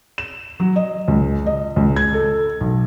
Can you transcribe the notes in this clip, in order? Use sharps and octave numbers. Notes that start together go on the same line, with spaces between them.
E7
F#3
D#5
C#2
D#5
C#2
G#6
A4
B1